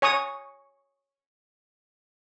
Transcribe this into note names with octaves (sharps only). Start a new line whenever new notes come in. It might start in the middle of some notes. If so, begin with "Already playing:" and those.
C#5 G#5 C#6 D#6